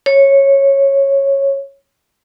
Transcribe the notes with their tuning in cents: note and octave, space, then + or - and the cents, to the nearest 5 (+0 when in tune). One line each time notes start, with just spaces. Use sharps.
C#5 -10